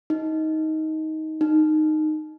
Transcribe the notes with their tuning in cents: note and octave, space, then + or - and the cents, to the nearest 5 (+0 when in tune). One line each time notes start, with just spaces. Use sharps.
D#4 +15
D#4 -10